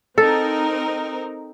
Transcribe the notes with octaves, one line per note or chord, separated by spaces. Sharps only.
C4 D#4 A4 A#4